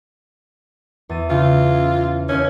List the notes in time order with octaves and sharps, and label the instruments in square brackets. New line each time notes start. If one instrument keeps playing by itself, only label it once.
[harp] E2 A6 D#7
[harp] C#3 [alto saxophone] F4
[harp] D#2 [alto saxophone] C#4